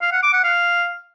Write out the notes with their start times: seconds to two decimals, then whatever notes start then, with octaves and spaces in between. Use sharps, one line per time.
0.02 F5
0.12 F#5
0.23 D6
0.34 F#5
0.44 F5